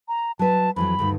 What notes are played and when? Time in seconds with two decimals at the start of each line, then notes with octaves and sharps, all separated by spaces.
0.08 A#5
0.39 F#3 B4 A5
0.76 F2 E3 F#3 B5
0.99 D2 G2 D#3